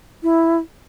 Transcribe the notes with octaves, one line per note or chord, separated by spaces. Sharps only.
E4